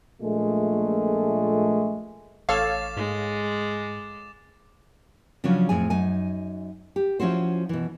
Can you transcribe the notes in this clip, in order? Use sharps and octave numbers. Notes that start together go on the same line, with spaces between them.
A#1 A#2 G#3 A3
A1 A4 C#5 F5 D6 A6 E7
G#2 G#3
C#3 F3 F#3 C#4 D4
F2 A2 G#4 G#5
F#2 D#4 G#5
G4
F3 C#4 E4 F#4 C5
B2 E3